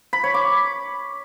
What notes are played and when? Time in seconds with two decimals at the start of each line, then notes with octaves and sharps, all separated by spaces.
0.13 B5
0.24 C#5
0.34 D6